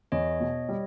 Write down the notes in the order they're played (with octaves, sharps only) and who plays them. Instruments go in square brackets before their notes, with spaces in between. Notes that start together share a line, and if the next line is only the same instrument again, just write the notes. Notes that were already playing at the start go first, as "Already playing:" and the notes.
[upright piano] E2 [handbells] C#5 D#5
[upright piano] B2
G3